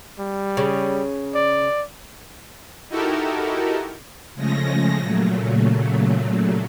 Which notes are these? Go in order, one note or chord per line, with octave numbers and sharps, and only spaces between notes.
G3
C#3
D5
D#4 E4 F#4 G4 A4 A#4
C#3 F3 G#3 A3 C#4 A#6
A#2 C#3 F#3 A3